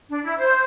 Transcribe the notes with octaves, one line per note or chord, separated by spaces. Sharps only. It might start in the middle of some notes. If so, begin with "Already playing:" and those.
D4
E4
C5